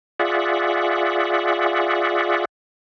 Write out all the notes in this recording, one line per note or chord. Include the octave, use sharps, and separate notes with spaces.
F4 G#4 D5 E5 F#5